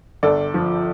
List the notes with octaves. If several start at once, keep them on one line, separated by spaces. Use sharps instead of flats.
G1 A4 D5
F3